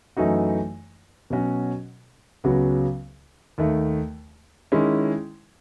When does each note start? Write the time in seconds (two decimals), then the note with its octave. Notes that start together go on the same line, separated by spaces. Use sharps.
0.17 F#2 E3 A3 D#4 F#4
1.30 B2 F#3 C#4 F#4
2.44 C#2 C#3 F#3 B3 F#4
3.58 D#2 D#3 A3
4.72 D#3 G#3 C#4 E4